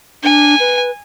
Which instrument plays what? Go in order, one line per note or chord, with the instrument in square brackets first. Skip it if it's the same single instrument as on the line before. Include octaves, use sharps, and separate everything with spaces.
[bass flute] D4 [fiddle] G#5
[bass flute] B4